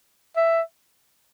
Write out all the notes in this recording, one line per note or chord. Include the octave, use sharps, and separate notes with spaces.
E5